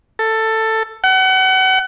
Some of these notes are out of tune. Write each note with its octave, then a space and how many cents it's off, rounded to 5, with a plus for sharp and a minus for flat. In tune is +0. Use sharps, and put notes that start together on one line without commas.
A4 +15
F#5 +30